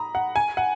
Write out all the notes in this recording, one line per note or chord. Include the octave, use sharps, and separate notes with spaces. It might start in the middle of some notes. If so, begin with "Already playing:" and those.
Already playing: A#5 B5 D#6
F#5
G#5
F#5